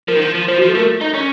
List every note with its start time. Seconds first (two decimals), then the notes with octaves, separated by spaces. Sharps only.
0.08 F3 A#4
0.16 D#3
0.21 F3
0.35 F3
0.48 F3 C5
0.58 F#4
0.62 F3
0.69 A4
0.75 A3 A#4
1.01 D#4
1.14 C#4